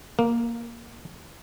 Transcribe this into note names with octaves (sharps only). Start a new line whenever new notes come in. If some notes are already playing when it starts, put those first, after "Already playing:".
A#3